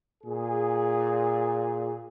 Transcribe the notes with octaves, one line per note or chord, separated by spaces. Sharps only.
A#2 G#4